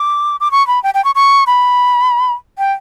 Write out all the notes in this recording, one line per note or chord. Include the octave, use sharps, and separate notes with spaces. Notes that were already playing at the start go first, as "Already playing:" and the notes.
Already playing: D6
D6
C#6
B5
G5
G5
C#6
C#6
B5
G5